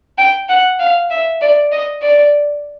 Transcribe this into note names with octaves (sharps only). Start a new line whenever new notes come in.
G5
F#5
F5
E5
D5
D#5
D5